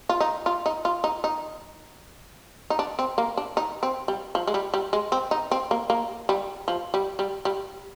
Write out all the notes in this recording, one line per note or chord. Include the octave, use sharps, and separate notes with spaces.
F4
D#4
F4
D#4
F4
D#4
D#4
D#4
D4
C4
A#3
D4
D#4
C4
G3
F3
G#3
G3
G3
G#3
C4
D#4
C4
A#3
A#3
G3
F3
G3
G3
G3